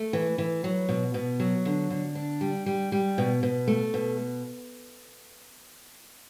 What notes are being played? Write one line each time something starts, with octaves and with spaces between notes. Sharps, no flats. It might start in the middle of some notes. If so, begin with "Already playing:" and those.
Already playing: A3
E3
E3
F#3
B2
B2
F#3
D3
D3
D4
G3
G3
G3
B2
B2
A3
B2